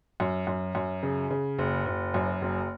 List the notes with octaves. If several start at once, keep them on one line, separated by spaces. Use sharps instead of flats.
F#2
F#2
F#2
C#3
C#3
F#1
F#1
F#2
F#1